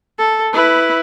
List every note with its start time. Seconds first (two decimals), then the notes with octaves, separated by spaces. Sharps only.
0.18 A4
0.53 E4 B4